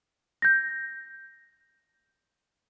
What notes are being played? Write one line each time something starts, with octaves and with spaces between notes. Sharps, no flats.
G6 A#6